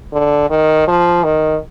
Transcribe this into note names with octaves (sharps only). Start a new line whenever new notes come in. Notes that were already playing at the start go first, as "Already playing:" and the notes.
D3
D#3
F3
D#3